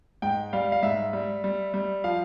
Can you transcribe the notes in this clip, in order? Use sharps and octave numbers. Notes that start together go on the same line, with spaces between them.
G#2 G5
G3 F5
F5
G#2 E5
G3
G3
G3
F3 F5